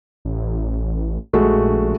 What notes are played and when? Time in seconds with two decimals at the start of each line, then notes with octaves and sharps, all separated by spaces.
0.25 A1
1.33 A#1 G#3 A3 F#4